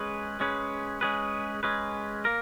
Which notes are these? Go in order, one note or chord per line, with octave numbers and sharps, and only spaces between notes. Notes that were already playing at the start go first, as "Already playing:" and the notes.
Already playing: G#3 C#4 G#4 B4
G#3 C#4 G#4 B4
G#3 C#4 G#4 B4
G#3 C#4 G#4 B4
A#3 A#4